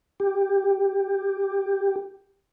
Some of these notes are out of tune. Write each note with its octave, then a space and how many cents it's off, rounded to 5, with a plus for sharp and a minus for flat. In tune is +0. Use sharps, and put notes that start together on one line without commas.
G4 +10